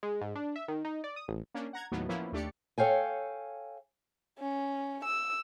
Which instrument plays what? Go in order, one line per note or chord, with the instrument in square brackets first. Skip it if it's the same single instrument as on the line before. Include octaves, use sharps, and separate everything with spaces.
[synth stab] G#3
G#2
D4
E5
D#3
D#4
D5
D#6
A1
A#3 C#4 D4
F#5 A#5 G#6
D#2 A2 D#3 F#3 B3
F3 A#3 B3 C#4 E4
D#2 A3 D4 G4 D5 C#7
[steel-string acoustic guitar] A4 C#5 F5 G5 G#5
[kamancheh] C#4
E6